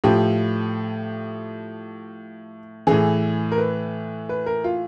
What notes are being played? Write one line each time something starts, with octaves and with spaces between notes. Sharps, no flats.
A2 F3 G4
A2 E3 G#4
A#4
B4
B4
A#4
F4